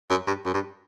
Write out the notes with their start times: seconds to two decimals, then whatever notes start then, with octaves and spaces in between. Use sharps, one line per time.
0.10 F#2
0.27 G2
0.45 F#2
0.54 G2